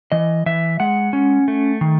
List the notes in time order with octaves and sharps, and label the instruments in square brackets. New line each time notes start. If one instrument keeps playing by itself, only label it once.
[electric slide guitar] E3 D#5
E3 E5
G#3 F#5
C#4
A3
D#3